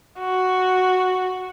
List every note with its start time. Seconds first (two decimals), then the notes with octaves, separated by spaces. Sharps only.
0.19 F#4